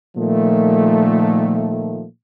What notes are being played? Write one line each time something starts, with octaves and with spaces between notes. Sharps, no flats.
A#2 D#3 F3 A3